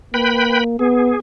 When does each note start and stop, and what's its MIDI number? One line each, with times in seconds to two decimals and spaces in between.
0.14 0.74 58
0.14 0.64 71
0.14 0.64 79
0.14 0.64 83
0.79 1.15 59
0.79 1.20 68